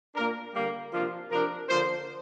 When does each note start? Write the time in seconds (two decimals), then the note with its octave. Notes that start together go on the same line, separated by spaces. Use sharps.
0.15 A#2 A#3 D4 A#4
0.54 D3 G3 A#3
0.92 C3 F3 A#3 D4 F4
1.30 C3 F3 D4 A#4
1.68 D3 F3 A#3 D4 C5